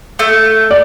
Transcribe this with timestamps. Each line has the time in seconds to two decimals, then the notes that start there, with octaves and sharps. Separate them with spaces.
0.19 A3
0.71 D5